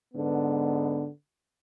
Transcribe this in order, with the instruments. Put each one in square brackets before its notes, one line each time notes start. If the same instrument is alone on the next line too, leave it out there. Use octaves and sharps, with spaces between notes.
[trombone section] G#2 D3 B3